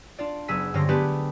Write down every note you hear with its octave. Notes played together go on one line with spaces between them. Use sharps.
D4 F4 D5
F#1 B3 G#4 G#5 E6 B6
G2 D3 C#4 C5 F6 A#6
A3 B3 D4 G4 G#4 B4